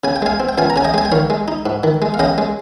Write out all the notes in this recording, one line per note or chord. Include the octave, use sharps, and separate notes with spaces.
C#3 G#5
G5
G#3 F5 G#5
C4
G5
C#2 F5 G#5
A#5
C#3 G#5
D#5 G5
G#3 G#5
G5
D#3 C#5 F5
G#3
D#4
G#2
D#3
G#3
F5
C#3 D#5 G5
G#3